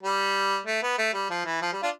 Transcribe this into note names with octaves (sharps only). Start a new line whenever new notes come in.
G3
A3
B3
A3
G3
F3
E3
F3
G3
D4 F4